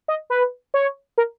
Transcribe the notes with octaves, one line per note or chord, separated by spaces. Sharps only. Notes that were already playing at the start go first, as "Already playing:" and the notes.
D#5
B4
C#5
A#4